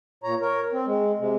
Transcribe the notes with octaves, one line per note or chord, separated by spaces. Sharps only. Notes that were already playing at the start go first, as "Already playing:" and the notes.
A#2 C#5 A#5
A#4 C#5
C4
G#3
C3 G#3